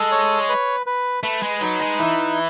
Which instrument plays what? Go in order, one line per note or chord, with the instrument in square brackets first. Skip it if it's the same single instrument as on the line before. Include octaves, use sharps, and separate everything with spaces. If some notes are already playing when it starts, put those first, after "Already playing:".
Already playing: [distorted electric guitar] G#3 [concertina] A4
[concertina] C#5
B4
B4
[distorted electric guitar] A3 [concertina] B4
[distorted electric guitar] G#3
[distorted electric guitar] F#3 [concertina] D#4
[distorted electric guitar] G#3
[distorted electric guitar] E3 [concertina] E4